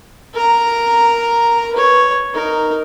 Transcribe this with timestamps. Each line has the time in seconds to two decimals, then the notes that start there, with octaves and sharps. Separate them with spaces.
0.33 A#4 A#5
1.73 B4 C#5
2.34 D#4 A#4